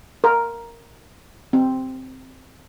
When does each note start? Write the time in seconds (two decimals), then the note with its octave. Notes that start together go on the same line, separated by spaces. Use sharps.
0.24 A#4
1.53 C4